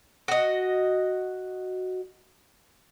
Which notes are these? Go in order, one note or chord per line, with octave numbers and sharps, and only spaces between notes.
F#4 D#5